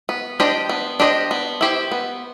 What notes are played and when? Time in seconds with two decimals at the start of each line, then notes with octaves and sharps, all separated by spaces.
0.09 B3
0.40 D4 G4 C5 D#5
0.69 B3
1.00 D4 G4 C5 D#5
1.31 B3
1.61 E4 G4 C5
1.92 B3